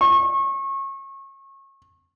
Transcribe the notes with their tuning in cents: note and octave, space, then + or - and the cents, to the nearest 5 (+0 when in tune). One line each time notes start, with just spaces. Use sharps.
C#6 -30